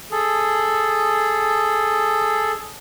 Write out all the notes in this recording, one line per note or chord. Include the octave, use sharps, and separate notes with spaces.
G#4 A4